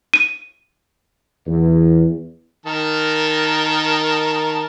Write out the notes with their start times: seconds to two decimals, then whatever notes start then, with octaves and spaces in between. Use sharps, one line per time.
0.14 D#7
1.46 E2
2.66 D#3 A#4 A5